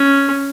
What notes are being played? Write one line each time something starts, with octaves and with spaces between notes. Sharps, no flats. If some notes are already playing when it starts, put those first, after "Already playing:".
Already playing: C#4